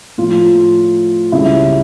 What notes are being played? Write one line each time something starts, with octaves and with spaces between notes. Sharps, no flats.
A2 F3 A3 F4
C#2 C#3 G3 E4